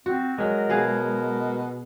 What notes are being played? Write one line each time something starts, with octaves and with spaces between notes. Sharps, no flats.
C4 F#4
F#3 G#3 A#4
B2 B3 G#4 F5